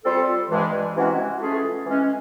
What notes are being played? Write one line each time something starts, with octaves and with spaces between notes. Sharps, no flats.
G3 C4 F4 A4
G2 E3 G#3
C3 E3 G#3 C#4 F#4
E3 A3 C#4 F4 G#4
E3 G#3 C#4